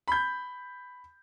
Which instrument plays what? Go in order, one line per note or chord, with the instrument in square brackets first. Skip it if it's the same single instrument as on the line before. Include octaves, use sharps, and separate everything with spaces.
[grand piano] B5 G6